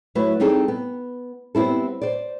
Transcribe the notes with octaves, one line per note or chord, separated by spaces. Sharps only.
F#3 A3 E4 B4
G3 C4 D#4 G#4 A4
B3
G3 B3 C4 E4 A4
C5 D5